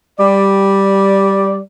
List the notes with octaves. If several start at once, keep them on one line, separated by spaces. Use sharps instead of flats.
G3 D5